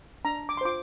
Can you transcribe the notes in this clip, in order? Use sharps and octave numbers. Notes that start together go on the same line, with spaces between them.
D4 A#5
D6
C6
F4 C5 D6